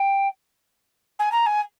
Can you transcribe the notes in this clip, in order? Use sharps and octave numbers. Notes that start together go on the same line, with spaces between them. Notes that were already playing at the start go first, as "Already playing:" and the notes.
Already playing: G5
G#5
A#5
G#5